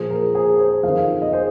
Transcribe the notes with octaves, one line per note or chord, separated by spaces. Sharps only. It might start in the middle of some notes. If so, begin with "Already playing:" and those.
Already playing: A#2 F3 G#4 C5
A#4
G#4 C5
G#4 C5
F2 D#3 C5 F5
D#5
G#4 C5